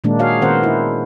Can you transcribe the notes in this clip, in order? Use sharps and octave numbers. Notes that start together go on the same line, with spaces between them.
A#2 D#3 G#3 A#3 D4
F#4 G#4 C#5 F5
D#3 B3 C#4 A#4 C5 F#5
E4